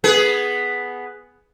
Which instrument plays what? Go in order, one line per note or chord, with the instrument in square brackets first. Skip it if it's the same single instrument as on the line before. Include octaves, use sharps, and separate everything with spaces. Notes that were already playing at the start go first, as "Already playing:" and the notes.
[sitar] B3 G#4 B4